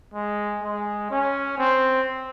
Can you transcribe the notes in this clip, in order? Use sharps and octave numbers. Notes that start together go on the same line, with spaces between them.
G#3
G#3
C#4
C4